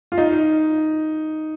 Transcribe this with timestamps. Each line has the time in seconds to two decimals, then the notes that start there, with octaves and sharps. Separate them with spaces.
0.12 F4
0.18 D#4